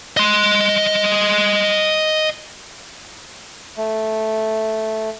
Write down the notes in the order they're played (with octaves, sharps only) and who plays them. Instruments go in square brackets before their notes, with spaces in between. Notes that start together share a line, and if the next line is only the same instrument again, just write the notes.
[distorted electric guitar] D#5 C6
[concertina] A3